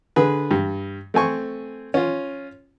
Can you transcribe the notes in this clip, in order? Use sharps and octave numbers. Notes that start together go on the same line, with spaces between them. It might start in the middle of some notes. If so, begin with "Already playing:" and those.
D3 G#4 B4
G2
A3 C4 G#5 C#6
C#4 F4